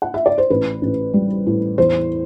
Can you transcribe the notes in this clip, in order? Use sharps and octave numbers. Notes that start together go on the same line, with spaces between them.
F#5
E5
D5
C5
A1 B4
A1
G3
A2
E2 C5